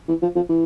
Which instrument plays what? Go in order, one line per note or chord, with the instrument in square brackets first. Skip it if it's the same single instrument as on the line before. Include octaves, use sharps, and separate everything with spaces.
[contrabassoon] E3
F3
F3
E3